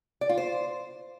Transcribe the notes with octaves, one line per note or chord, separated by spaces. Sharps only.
D5
F4
C5